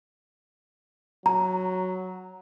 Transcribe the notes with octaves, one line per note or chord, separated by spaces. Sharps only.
F#3 A#5